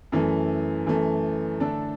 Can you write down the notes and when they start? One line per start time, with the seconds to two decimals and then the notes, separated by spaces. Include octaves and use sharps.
0.12 F#2 E3 A3
0.87 F#2 E3 A3
1.60 D3 A3 D4 A4